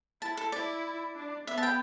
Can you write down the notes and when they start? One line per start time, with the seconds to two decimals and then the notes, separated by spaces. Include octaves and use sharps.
0.22 E4 A5
0.37 A4
0.52 E4 D5
1.15 D4
1.47 B3 E5
1.58 A5
1.63 G5